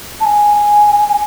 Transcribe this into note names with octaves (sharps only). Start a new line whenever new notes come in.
A5
G#5